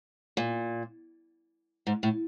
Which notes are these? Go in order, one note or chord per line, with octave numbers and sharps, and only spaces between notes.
A#2
G#2
A2